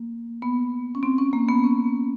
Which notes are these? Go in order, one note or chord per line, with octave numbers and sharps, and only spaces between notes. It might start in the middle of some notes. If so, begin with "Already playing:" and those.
Already playing: A#3
B3
C#4
C4
C#4
A#3
B3
C#4